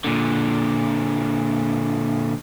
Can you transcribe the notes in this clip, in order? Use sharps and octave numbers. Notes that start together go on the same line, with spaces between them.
A#2 D3